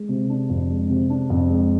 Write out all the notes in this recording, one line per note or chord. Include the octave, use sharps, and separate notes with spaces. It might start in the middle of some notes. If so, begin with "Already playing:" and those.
Already playing: G#3
C3
D4
F2
G#3
C3
D4
F2
G#3